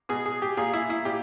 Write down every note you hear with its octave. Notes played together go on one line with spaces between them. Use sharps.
B2 G#4
G#4
G4
A#2 G#4
E4
E4
A#2 G4